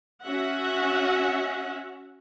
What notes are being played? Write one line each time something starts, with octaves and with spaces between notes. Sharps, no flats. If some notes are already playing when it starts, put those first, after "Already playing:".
C#4 F#4 E5 F#5